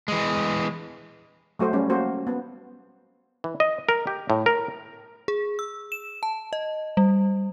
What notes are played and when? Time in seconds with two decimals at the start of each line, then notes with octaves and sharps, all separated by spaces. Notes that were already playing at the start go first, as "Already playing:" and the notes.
0.08 E3 G#3
1.59 F#3 A3 F#4 C5
1.73 G3 C#4
1.90 A#3 F#4 C5
2.27 B3
3.44 E3
3.60 D#5
3.89 A#4
4.07 G4
4.30 A2
4.46 A#4
5.28 G#4
5.59 E6
5.92 E7
6.23 A5
6.53 D#5
6.97 G3